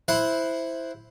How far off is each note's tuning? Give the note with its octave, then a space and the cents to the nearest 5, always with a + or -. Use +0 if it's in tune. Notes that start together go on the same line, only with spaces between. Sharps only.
E4 +0 C5 +0 F#5 +0